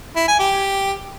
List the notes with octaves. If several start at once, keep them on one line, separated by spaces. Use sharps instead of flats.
E4
G#5
G4